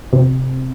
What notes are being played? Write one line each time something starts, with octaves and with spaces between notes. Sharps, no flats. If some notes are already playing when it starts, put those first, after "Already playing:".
C3